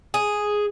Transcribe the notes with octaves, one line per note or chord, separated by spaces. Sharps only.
G#4